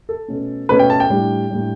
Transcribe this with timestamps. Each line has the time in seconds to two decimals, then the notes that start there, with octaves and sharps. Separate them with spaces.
0.09 A4
0.28 B2 A3 C#4
0.69 B2 A3 C#4 B4
0.79 G5
0.90 A5
1.00 G5
1.10 A2 G3 D4
1.50 A2 G3 D4